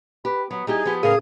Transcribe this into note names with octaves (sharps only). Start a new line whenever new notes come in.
G4 B4
F#3 B3
G3 D#4 E4 G4 G#4
F3 B3 G4
A2 C#3 G#4 A#4 F5 D#6